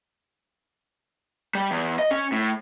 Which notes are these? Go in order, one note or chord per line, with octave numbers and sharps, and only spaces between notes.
G3
E2
D#5
C#4
A2